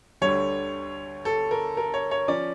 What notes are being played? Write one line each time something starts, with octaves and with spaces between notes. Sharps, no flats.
D2 D3 G3 C#5
A4
A#4
A#4
C#5
C#5
F3 C#4 D5